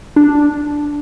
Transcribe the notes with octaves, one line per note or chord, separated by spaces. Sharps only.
D4